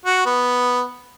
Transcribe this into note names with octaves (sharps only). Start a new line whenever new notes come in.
F#4
B3